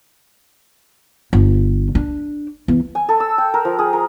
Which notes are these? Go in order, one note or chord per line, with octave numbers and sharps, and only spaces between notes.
G1
D4
E2
G#5
A4
E6
G5
A#4
F3
G#4
A#4